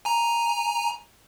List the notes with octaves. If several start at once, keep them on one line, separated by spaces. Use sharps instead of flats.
G#5 A#5